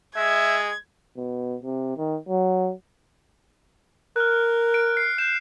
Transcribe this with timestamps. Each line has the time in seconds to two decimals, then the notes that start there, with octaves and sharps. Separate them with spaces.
0.17 G#3 E5 G#6
1.17 B2
1.63 C3
1.97 D#3
2.28 F#3
4.16 A#4 F6 F#6
4.74 D7
4.97 C7
5.18 F#6 G6 E7